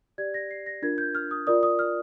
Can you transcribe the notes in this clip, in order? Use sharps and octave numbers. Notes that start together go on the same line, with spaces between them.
G4 D5 G#6
A#6
C7
A#6
D4 F4 A#4 G#6
G6
F6
D#6
F4 A#4 D5 D#6
D#6
F6